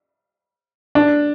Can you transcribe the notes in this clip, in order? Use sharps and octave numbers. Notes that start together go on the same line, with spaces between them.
D4